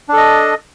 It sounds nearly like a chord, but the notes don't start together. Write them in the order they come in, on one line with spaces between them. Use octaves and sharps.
D4 A4 D#5